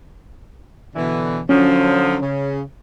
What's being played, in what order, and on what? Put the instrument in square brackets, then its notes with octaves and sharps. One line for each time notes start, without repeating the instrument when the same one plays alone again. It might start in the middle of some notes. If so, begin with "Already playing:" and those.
[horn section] B2 D3 E3
[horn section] D3 F3 F#3 [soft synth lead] C#4
[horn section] C#3